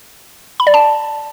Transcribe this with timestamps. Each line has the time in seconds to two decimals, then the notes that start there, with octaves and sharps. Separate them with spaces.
0.60 B5
0.67 D5
0.74 A5